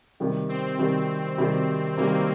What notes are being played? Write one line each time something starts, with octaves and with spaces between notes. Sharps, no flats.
C3 D#3 G3
C4
C3 D#3 G3
C3 D#3 G3
C3 D#3 G3 A#3